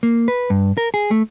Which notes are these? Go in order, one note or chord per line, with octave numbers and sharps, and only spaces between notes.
A#3
B4
G2
A#4
G#4
A3